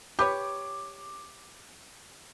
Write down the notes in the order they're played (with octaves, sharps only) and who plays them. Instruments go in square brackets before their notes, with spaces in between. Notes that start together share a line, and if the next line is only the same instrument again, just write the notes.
[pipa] G4 B4 C#5 [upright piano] D6